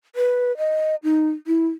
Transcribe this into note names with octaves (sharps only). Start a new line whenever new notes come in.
B4
D#5
D#4
E4